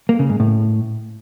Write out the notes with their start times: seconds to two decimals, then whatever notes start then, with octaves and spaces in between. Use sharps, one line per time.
0.09 A#3
0.19 C#3
0.30 G#2
0.40 A2